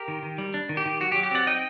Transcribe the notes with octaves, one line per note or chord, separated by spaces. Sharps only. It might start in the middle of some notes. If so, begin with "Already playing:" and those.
Already playing: G4 A#4
D#3
D#3
G3
D4
D#3
G4
D#3
F#3 F#4
G4
F#3
G4
C4 D5 F#5
D#4 D#5 G5